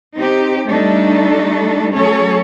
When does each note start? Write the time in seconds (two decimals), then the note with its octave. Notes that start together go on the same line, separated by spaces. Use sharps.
0.16 C4 D#4 G4
0.67 G3 A3 D4 D#4 A4
1.93 F#3 A3 C#4 A4 C#5